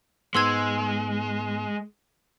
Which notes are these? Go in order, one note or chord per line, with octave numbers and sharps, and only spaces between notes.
G#2 G#3 B3 C6 E6 G#6